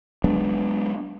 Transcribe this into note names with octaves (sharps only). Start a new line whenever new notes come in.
F#3 G#3 B3 D4